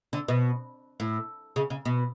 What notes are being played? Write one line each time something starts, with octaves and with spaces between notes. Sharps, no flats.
D3
B2
A2
C#3
C#3
B2